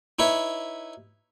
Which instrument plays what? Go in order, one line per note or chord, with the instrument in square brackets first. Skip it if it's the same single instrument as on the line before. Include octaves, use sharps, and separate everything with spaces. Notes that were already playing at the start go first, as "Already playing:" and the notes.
[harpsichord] D#4 E4 B4 C#5